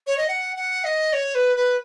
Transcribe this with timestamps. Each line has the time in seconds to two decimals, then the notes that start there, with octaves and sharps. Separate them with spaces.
0.07 C#5
0.18 D#5
0.28 F#5
0.57 F#5
0.84 D#5
1.13 C#5
1.35 B4
1.56 B4